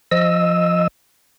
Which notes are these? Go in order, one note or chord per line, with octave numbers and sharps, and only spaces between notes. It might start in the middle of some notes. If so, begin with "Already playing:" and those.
F3 D#5 E6